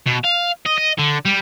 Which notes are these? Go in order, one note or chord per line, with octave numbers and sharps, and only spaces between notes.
B2
F5
D#5
D#5
D3
G3